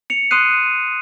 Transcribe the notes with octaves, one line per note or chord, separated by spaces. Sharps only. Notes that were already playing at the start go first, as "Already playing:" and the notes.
C#7 F7
C6 D#6 F#6 C7 D#7